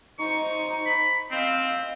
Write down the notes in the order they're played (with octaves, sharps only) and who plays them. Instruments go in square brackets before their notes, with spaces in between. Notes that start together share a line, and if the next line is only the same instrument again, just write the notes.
[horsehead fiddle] D#4 C5 [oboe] C#6
[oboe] B5
[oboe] C4 [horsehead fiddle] D#5 F5